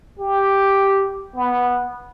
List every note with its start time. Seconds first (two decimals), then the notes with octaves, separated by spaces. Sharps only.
0.19 G4
1.36 B3